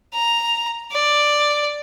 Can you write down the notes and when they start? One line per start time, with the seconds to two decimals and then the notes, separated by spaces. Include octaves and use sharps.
0.14 A#5
0.93 D5